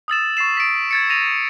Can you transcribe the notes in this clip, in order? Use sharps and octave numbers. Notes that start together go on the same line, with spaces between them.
D#6 E6 A6 E7
C#6 A6 C7 E7
B6 D7
G#6 A6 C#7
A#6 D#7 F7